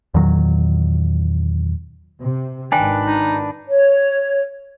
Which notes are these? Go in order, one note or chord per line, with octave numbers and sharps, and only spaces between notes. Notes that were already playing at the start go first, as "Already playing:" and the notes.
E2 A#2 D#3 F#3
C3
G#1 D#3 D4 B4 G5 G#5
D#4
C#5